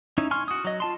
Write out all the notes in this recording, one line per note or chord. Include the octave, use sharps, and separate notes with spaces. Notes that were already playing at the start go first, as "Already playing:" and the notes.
C#4 D#4 E4
G#5 C6 C#6 F6
F#4 D#6
F#3 D#5
F4 A5 C6